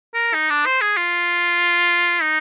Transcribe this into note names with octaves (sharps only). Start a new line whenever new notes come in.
A#4
D#4
D4
C5
G#4
F4
D#4